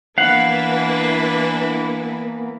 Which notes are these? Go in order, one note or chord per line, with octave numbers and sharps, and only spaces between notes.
E3 A#3 B3 D4 E4 B4 F5 F#5